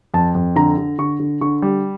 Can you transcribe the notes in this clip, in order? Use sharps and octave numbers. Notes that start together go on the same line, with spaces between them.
F2 A5
F2
D3 A#5
D3
D3 C#6
D3
D3 C#6
G3